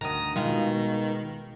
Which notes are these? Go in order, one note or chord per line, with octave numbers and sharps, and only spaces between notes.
D2 D#3 A#5 D#6
B2 D#3 G#3 F4